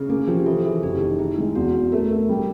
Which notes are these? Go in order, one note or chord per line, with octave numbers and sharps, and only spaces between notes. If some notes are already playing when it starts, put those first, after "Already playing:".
Already playing: C#3
A#3 G#4
F3 G4
E3 A4
E3 G#4
F#1 G4
E3 D#4
D#3 E4
G#3
E2 F#4
E2
A3 A#4
A3
G3